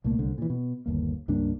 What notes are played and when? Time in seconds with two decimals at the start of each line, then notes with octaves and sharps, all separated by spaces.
0.04 C2 A#2 A3 A#3
0.19 C2 D3
0.38 A#2 E3
0.50 B2
0.86 G1 D#2 A#3
1.28 C#2 G2 A#3 D4